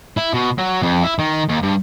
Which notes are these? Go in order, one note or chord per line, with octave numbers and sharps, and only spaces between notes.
E4
B2
F#3
F2
E4
D#3
D#2
G2